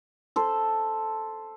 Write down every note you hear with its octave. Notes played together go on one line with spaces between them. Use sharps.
A4 C5